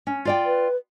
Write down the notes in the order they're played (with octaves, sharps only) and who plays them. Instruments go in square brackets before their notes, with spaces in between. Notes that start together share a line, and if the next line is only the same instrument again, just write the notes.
[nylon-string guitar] C#4
F4 D5 G5
[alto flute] B4